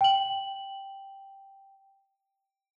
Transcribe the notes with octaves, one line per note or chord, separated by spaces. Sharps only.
G5 F#7